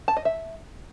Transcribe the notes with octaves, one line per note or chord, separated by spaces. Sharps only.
A5
D#5
E5